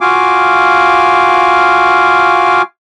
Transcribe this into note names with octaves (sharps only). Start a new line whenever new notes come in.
F4 F#4 F5 G#5 D6